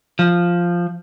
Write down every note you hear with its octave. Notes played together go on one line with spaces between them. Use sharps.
F3